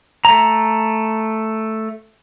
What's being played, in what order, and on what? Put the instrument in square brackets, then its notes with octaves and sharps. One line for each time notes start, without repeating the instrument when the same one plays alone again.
[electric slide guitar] A3 A#5